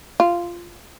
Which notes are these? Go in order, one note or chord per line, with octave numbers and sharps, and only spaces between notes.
F4